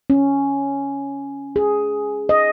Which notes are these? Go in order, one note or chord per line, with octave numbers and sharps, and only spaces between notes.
C#4
G#4
D#5